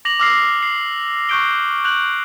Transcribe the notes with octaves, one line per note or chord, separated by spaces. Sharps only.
D6 A#6 F7 F#7
D6 E6 F6 A#6 C7
C7
C#6 F#6 G6 A#6 D7 G7
F#6 G6 F7 F#7